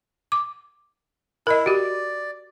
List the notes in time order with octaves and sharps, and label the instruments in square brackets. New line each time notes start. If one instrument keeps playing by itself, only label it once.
[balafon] D6
[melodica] E4 [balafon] A#4 D#5
[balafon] F#4 G4 [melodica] D5